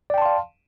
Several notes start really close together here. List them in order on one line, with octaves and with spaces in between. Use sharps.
D5 G5 A5 C6 F5